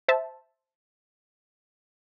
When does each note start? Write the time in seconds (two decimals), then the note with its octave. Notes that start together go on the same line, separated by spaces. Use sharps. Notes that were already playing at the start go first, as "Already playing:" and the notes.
0.08 C5 E5 A5